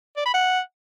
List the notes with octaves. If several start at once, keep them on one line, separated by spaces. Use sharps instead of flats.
D5
B5
F#5